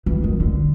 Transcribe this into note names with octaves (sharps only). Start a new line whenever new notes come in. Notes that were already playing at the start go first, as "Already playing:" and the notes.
E3
D#3
D3